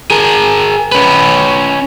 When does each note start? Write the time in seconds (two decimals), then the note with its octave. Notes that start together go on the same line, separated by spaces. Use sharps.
0.10 G#4 A#4
0.92 C#4 B4